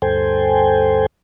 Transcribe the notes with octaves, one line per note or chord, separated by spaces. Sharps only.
D2 G2 A4 C5 G5 G#5